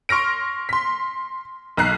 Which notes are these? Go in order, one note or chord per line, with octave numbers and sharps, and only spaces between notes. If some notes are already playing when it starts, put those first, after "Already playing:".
C6 C#6 F6 A#6 D7
C6 B6
B1 A#5 F#6 C7